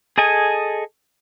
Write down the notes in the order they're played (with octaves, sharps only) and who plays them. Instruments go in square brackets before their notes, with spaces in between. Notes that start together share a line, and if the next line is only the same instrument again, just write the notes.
[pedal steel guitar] G#4 A4 D#5 G#5